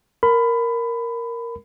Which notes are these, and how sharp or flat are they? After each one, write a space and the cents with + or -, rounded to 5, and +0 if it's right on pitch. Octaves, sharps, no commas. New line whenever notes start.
A#4 +0 B5 +20